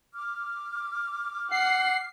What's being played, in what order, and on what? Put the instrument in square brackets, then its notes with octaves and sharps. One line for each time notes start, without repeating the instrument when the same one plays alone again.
[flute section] D6 F6
[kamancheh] F#5 [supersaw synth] C7